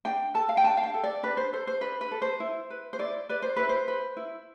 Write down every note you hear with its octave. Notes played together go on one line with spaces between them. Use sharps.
D4 G5
A4 A5
F5
G5
D4 A5
F5
G5
A4
D5
D4 B4
C5
A4 C5
C5
D4 B4
B4
A4
C5
E4
B4
C5
E4 D5
B4 D5
C5
E4 B4
C5
B4
E4